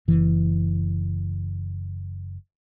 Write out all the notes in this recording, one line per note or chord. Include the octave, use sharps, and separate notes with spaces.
F#1 E3